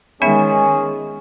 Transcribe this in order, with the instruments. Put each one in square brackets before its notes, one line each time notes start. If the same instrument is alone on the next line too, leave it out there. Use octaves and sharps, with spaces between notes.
[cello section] D#3 G#3 [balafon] B3 D#4 E5 [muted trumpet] C#4 [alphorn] G#4